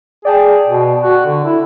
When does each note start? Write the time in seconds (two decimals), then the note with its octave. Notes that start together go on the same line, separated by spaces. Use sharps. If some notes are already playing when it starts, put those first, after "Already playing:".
0.25 G#4 D5 G5 A5
0.67 B2
1.03 F#4
1.26 D3
1.45 E4